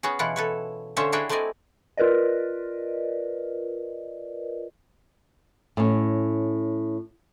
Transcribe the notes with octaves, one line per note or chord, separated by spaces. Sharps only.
B3 C#4 F#4 G#4
B2 E3 E4 F4 F#5
A4 B4 C#5
D3 C#4 F4 C5 C#5 E5
D4 E4 F#4 G#4 C#5 G5
A3 C4 E4 D5 D#5 G#5
F4 A#4 B4 D5 D#5
A2 C#4